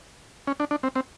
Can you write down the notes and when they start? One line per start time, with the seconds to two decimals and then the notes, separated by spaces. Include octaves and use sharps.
0.47 C#4
0.60 D4
0.71 D4
0.83 C4
0.96 C4